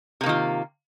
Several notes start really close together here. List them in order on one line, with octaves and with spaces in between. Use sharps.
C3 A#3 D#3 F4